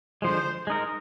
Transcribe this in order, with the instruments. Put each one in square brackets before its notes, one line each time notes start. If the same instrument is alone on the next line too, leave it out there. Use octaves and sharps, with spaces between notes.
[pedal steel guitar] D3 F3 G#3 [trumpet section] C5
[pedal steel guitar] G#3 D#4 A#4